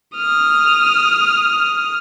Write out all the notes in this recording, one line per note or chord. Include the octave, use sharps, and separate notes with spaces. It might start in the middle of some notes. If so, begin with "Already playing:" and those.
D#6 F6